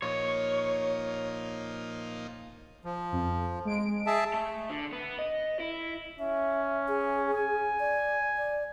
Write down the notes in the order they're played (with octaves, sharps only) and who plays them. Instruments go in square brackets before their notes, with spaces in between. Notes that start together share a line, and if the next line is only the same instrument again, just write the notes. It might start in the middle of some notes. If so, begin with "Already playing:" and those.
[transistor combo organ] A#2 F3 D#4 [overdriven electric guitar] C#5
[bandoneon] F3
[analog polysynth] F2
G#3 D7
[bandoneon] G#4 E5 A5
[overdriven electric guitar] A3
D3
B3
D#5
E4
[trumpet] C#4 [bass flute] E5
[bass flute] G#4
[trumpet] G#5
[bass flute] D5
D5